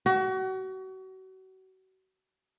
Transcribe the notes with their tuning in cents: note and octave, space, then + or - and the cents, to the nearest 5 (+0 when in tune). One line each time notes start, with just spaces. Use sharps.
F#4 +35